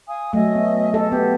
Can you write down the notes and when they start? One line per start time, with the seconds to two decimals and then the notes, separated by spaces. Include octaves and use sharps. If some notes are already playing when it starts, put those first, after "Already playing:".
0.07 F5 G#5 D#6
0.33 F#3 A3 D#5 E5 G#5
0.55 B3
0.94 A4
1.12 B3 G4